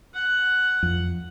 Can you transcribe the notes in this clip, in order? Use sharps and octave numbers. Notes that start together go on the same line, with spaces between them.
F#5
F2